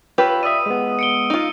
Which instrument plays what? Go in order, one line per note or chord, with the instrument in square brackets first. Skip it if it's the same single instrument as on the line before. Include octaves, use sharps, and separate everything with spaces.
[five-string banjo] F4 G4 B4 [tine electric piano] C#5 B5 E6
[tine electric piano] D5 E5 [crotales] D#6 E6 D#7
[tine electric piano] G#3 B3
[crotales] C#7 D7 G7
[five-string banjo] D#4 F4